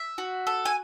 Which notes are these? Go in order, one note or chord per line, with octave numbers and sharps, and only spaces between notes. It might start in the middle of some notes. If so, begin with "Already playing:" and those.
Already playing: E5
F#4
A4
G#5